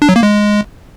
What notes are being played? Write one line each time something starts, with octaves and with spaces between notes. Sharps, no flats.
D4
F#3
A#3
G#3